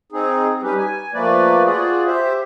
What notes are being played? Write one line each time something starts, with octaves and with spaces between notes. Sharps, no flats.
C4 D#4 G#4
G3 C#4 D#4 G4 B4
G#5
F3 A3 A#3 B4 D5
F4 F#4 G#4 D5
G4 C5 E5